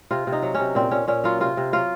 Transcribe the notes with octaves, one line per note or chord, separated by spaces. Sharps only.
C3 F4
C3
D#4
F#3
C#4
C3
A#2 C4
A#2 C#4
A#2 C#4
F#3 F4
C3 F4
C3
F#3 F4